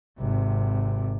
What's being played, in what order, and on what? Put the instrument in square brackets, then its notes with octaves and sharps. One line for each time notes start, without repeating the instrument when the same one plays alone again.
[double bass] G#1 C3